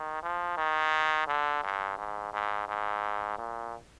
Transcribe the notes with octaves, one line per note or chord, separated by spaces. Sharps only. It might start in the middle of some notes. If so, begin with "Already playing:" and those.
Already playing: D#3
F3
D#3
D3
G2
G#2
G#2
G#2
A#2